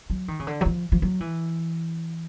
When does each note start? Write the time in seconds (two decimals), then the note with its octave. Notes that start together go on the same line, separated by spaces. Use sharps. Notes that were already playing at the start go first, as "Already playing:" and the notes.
0.10 F#3
0.28 D#3
0.40 C#3
0.47 D3
0.61 F#3
0.65 F3
0.92 F3
1.02 F#3
1.20 E3